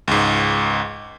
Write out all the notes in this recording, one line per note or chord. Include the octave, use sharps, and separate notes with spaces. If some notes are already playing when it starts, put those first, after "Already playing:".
C#2 G#2